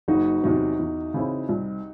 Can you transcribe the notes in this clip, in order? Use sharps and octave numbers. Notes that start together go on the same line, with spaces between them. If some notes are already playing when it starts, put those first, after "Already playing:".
F#1 D#4 F#4
E2 C3 F#3 D#4
E2
C#3 E3 C4 E4
C2